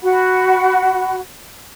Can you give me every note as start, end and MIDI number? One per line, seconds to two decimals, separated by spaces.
0.02 1.19 66
0.02 1.19 78
0.02 1.19 83